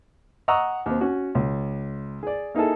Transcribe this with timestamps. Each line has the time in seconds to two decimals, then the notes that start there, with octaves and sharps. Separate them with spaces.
0.48 D#5 F#5 A#5 C#6 D#6 E6
0.86 D#2 C4
1.01 C#4 F#4
1.35 C#2
2.23 G#4 D5
2.55 A#3 D#4 E4 G#4 A4